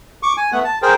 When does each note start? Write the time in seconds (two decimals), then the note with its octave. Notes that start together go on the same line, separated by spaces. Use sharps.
0.23 C#6 D6
0.37 G#5
0.52 A3 B3 F#5
0.64 A5
0.82 G#4 A#4 C5 G5